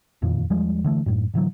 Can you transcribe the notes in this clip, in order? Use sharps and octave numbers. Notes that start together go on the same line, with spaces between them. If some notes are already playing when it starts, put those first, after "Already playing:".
E1 F2 A#2 D#3
E2 F3 G3 G#3
D3 E3 A3
F#2 A2
A2 D3 E3 F#3